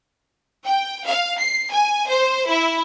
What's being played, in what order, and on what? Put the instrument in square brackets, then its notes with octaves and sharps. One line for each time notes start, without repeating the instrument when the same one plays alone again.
[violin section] G5
F5
C7
G#5
C5
E4